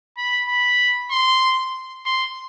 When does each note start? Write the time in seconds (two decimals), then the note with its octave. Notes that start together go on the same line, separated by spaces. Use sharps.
0.17 B5
0.49 B5
1.11 C6
2.06 C6